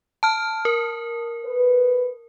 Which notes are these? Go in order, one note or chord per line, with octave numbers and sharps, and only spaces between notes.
A5 F6
A#4
B4